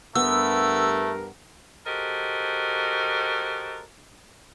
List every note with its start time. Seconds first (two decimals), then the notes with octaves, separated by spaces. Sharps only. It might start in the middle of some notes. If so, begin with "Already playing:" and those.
0.15 G2 A3 B3 A#4 E6
1.87 F#4 G4 A4 A#4 C5 D#5